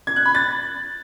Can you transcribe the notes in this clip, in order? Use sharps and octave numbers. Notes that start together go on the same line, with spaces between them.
G#6
F#6
B5
A6